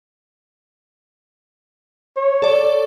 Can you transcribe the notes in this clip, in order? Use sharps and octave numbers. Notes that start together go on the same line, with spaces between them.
C#5
A4 D5